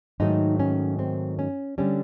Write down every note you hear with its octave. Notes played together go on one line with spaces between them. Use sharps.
G#2 D#3 F#3 A3 D#4
C#4
C4
C#4
D3 G3 C#4